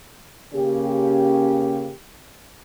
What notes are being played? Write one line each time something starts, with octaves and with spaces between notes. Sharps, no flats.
C#3 A#3 C#4 G4